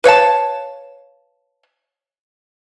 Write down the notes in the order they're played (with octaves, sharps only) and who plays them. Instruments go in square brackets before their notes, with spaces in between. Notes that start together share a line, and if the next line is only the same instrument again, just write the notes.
[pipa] B4 C#5 F5 A5